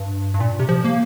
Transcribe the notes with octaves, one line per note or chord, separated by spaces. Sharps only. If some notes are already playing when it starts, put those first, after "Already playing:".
Already playing: G2
G2
A#2
C3
F3
A#3